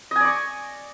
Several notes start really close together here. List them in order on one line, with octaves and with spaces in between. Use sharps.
D#5 G#5 D5 C#6